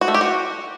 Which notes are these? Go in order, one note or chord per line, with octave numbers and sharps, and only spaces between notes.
F#4
A3
G4
F#4